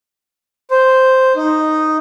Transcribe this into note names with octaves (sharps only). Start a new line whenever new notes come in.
C5
D#4